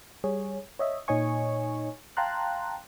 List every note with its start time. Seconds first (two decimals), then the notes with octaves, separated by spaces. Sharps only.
0.24 G3 G#4 C#5
0.79 C#5 D#5 E5
1.08 A#2 D#4 C#5 D#5 G#5 C#6
2.17 F5 G5 A5 A#5 C6 F#6